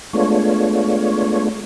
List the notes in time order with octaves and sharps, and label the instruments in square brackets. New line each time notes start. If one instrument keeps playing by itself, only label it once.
[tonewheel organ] G#3 A3 B3 D4 F4 C#5